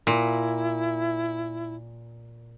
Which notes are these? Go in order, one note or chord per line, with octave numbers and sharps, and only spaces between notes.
A#2 E4